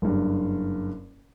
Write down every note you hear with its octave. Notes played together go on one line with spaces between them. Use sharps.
F#1 G2